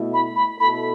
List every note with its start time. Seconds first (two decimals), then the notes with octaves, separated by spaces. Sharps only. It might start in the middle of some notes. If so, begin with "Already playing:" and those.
Already playing: B2 A3 E4
0.13 B5
0.36 B5
0.59 B2 A3 E4 A4 B5